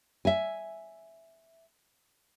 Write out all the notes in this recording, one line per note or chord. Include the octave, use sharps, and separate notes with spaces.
E5 G#5